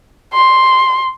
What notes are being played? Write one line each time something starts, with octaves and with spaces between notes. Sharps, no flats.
C6